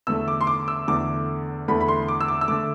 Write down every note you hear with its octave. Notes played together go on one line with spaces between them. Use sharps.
E2 D3 A3 E6
D6
C6
D6
E6
E2 D3 A3 D6
E2 D3 A3 B5
B5
C6
D6
E6
D6
E6
D3 A3 D6